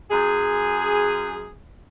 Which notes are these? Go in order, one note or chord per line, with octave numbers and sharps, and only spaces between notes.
F#2 G#4